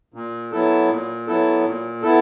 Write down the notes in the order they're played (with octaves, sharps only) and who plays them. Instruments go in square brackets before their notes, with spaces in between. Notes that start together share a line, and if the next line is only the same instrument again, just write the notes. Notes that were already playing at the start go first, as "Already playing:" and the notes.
[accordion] A#2
F#3 B3 E4 A4
A#2
F#3 B3 E4 A4
A#2
B3 E4 A4